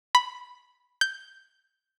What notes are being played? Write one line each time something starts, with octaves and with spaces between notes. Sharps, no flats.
B5
G6